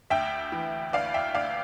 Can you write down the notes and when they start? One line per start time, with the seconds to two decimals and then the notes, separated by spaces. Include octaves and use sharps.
0.10 D2 E5 G5
0.52 E3
0.93 D2 D5 F5
1.14 E5 G5
1.34 D2 D5 F5